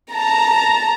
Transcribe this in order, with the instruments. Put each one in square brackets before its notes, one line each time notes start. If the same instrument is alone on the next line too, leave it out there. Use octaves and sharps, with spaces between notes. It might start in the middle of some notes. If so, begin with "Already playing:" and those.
[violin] A5 [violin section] A#5